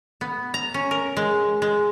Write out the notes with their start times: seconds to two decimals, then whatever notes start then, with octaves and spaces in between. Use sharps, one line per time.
0.21 B3
0.54 A#5
0.74 C#4
0.91 A#4
1.17 G#3
1.62 G#3